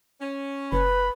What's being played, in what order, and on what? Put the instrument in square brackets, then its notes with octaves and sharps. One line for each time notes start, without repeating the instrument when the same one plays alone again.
[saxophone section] C#4
[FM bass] F#1 [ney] B4 [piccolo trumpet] B5